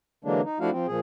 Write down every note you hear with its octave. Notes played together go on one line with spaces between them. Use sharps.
D3 E3 F#3 G#3 A#3 D4
D#4
F3 A3 D4 E4 F#4 F5
F3 C4
A#2 F3 G#4